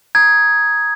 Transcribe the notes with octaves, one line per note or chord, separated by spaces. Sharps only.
A#5 D#6 G#6